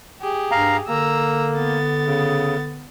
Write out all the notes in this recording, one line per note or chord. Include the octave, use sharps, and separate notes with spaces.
G4 G#4
G2 F5 A#5
D3 A#3 A#5 E6
B3 A6
C#3